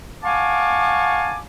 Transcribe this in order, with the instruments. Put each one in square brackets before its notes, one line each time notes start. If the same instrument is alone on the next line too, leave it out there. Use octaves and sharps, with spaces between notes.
[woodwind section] F5 F#5 G#5 A5 C#6 D6